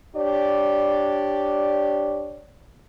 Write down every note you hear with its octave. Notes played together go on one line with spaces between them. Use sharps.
D4 G4 C#5 D5